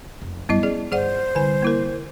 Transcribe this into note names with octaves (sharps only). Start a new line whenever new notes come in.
F1
G2 B3 E4 D#5
C#4 G#4 D5
G1 G#4 C5 D5 F#5
C2 D3 G#5
A#3 E4 A#4